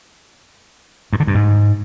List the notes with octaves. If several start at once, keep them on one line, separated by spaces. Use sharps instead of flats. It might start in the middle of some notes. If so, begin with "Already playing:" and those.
G2
D3
G2
G#2